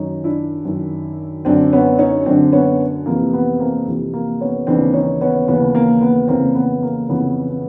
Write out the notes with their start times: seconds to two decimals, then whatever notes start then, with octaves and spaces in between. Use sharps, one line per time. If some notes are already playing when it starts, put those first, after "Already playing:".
Already playing: F#2 D#3 C#4 D#4
0.24 D4 E4
0.65 F#2 D#3
1.45 F#2 D3 C4 D4
1.73 B3 C#4
1.99 C#4 D#4
2.26 F#2 D3 C4 D4
2.52 B3 C#4
3.06 F2 C3 E3 A#3
3.33 B3
3.60 A#3 C4
3.87 F2 C3 E3
4.14 A#3
4.40 B3 C#4
4.67 D#2 C#3 E3 C4 D4
4.94 C#4 D#4
5.21 B3 C#4
5.48 D#2 C#3 E3 B3
5.75 A#3
6.01 B3
6.28 F2 C#3 E3 A#3 C4
6.55 B3
6.83 A#3
7.09 F2 C#3 E3 B3
7.49 B3